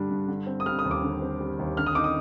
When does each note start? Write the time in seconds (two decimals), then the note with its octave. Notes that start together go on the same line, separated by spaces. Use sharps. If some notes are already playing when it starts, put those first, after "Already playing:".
Already playing: G2 D3 G3 D4
0.10 G2
0.28 D3
0.47 C4
0.60 D#6
0.66 G3 F6
0.79 D#6
0.85 D#2
0.91 D6
1.03 D3
1.22 C4
1.40 G3
1.59 D#2
1.77 D3 F6
1.86 D#6
1.95 D#4 D6
2.04 D#6